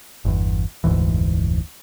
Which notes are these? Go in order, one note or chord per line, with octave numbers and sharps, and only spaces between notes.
G1 E2
F1 D2 G#2 E3